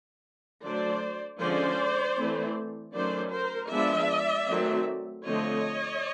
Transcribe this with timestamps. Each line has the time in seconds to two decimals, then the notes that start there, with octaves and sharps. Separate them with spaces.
0.64 D3 F#3 A3 D4 C5 D5
1.40 D3 F3 G#3 C#4 C5 D5
2.17 E3 A3 C4
2.95 D#3 F#3 A3 C#4 C5 D5
3.33 A#4 C5
3.71 F3 G#3 B3 D4 D5 E5
4.49 D#3 F#3 A3 C4
5.26 D3 F3 A3 C4 C#5 D#5